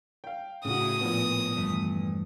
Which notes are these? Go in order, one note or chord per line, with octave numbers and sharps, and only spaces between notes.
F5 G5
A2 C#3 F#4 D#6
A#2 F3 B3
E2 G2 A3